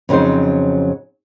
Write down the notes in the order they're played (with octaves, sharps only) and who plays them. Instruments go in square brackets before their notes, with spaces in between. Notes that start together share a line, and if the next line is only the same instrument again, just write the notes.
[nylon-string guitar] F2 C#3 F#3 D#4 C5